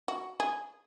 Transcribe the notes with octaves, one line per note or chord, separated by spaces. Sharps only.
F#4
G#4